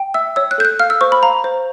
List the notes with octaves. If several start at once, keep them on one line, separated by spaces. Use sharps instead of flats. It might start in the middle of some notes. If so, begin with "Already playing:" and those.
Already playing: G5
E5 E6
C#5 E6
F#6
A4 G6
F#6
F5 F6
E6
C5 C#6
B5
F5 A#5
C5